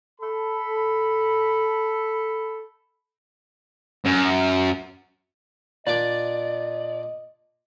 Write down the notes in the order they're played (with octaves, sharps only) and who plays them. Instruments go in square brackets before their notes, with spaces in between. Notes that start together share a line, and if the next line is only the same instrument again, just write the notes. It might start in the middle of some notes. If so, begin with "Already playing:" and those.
[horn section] A4 B5
[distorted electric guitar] F#2
[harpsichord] A#2 D4 D6 [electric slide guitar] D5 [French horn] D#5